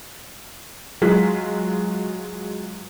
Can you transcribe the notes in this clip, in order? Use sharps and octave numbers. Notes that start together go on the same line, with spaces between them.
F#3 G#3 F4 G#4 F#6 B6